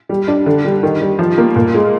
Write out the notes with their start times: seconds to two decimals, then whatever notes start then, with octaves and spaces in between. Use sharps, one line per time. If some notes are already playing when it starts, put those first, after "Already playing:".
0.09 G3
0.28 D4
0.46 D3
0.64 G3
0.83 D#3
1.01 G3
1.19 F3
1.38 A#3
1.56 A#2
1.74 G#3